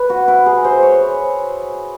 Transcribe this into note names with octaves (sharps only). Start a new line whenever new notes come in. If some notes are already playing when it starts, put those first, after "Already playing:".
Already playing: B4
F#4
E4
G#4
C5
C#5